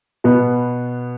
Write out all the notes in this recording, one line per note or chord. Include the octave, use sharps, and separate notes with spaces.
B2 B3